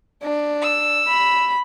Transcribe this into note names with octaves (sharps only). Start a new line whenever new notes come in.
D4
E6
B5